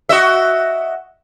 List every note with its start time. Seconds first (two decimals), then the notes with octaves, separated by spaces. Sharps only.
0.09 F#4 D#5 E5